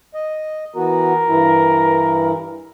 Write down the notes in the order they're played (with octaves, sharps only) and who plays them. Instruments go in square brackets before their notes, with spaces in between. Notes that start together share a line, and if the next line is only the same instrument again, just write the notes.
[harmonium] D#5
[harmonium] E3 B3 F#4 [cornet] A#4
[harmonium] G2 E3 E4